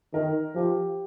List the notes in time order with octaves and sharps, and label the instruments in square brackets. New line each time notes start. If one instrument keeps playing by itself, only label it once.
[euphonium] D#3 [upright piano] A#4
[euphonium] F3 [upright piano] G4